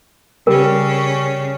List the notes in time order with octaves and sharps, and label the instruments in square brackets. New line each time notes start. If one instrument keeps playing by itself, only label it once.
[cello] C#3 C#4 [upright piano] G3 G4 [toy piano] A#4